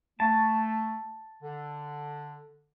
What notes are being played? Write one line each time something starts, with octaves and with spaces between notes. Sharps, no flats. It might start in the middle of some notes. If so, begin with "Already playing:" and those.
A3 A5
D3